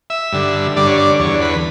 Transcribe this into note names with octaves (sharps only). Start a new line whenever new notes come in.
E5
G2 D3
G2 D3 D5
C#5
D5
E2 D3 C#5
B4